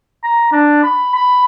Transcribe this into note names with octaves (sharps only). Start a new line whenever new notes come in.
A#5
D4
B5
B5